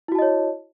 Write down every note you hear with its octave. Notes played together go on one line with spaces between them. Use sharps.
E4 F#4 C#5 D#5 A5